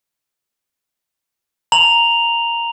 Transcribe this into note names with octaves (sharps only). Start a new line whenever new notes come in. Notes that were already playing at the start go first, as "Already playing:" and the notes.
A#5 F7 F#7